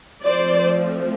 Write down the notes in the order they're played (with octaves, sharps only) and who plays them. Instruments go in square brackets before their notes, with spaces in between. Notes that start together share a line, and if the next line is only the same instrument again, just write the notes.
[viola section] F3 A3 C4 C5 D5